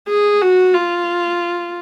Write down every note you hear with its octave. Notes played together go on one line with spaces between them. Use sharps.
G#4
F#4
F4